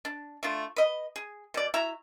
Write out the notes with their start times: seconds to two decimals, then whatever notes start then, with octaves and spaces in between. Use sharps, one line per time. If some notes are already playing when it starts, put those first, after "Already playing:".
0.05 D4
0.43 A3 D4 F4
0.76 B4 D#5
1.16 G#4
1.54 B2 D5
1.74 E4 F#4 E5 A#5